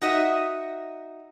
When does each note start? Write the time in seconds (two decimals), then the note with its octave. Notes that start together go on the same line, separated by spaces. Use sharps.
0.01 D#4 F#4 D#5 E5